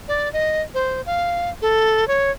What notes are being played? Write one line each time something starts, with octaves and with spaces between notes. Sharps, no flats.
D5
D#5
C5
F5
A4
C#5